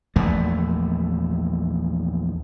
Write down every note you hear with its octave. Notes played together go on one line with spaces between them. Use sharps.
A#1 E2 A3